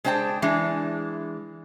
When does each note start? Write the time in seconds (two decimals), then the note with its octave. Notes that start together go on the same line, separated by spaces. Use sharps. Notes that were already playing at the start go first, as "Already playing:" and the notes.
0.04 G#3 D4 C5 G5 A5
0.42 E3 G#3 D4